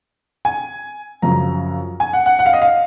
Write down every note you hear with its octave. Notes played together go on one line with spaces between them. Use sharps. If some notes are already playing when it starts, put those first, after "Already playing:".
G#5
F#2 C#3 F3 A#5
G#5
F#5
F#5
F#5
F5
D#5
F5